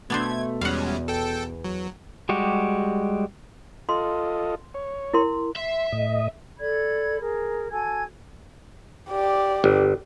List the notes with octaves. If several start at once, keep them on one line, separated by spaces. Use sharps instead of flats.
B2 A3 B3 D4 C5 G#6
E2 G3 G#3 C#4 F5 F#5
A4 G5
F#3
G3 G#3 F#4 G4
F4 A4 D#5 C6
C#5
E4 A#4 C6
E5 C6
A2 D#5
A4 D5 B5 G#6
G#4 A#4
F#4 A4 G#5 G#6
G4 D5
G1